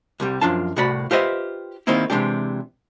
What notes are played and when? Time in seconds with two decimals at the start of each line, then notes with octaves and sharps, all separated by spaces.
0.20 C2 C3 G3
0.41 F#2 F3 D4 F4 A5
0.76 C2 A2 C3 F#4 D5 B5
1.11 F4 G4 B4 C5 D#5 E5
1.87 D#3 G3 A#3 C4 D#4 E4
2.10 C3 D#3 E3 G#3 D4 G4